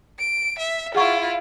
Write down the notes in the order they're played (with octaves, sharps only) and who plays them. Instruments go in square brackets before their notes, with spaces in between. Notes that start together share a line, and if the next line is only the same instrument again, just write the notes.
[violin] D7
E5
[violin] E4 F4 [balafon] G#4 F#5 C#6